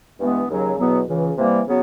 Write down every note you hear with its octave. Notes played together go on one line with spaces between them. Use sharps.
G2 E3 G#3 B3
D#2 C#3 F#3
E2 B2 F#3 B3
C#2 C#3 E3
C3 E3 G3 A#3
C#3 F#3 B3